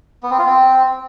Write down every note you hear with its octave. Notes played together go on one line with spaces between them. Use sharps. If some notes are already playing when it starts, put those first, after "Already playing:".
B3
C4
F4
C4